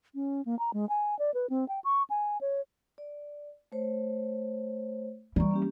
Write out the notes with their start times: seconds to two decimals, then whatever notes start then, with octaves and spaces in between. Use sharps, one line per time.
0.15 C#4
0.45 A#3
0.59 A#5
0.74 G#3
0.89 G#5
1.19 D5
1.34 B4
1.50 C4
1.68 G5
1.84 C#6
2.10 G#5
2.41 C#5
2.98 D5
3.72 A3 C5 C#5
5.36 E3 G3 D5 A#5 C#6
5.51 A#3 C#4 G4